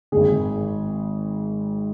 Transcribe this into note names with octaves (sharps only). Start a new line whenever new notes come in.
G#1 G#2 D#3 G#4